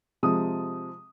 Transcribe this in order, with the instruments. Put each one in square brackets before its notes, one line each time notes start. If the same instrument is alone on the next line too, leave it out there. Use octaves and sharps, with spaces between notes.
[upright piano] C3 F3 G#3 D#6